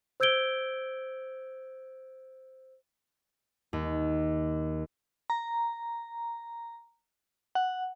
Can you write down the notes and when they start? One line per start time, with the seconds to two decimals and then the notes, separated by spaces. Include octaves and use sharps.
0.20 C5 E6 G6 G#6 D7 G7
3.73 D#2
5.30 A#5
7.55 F#5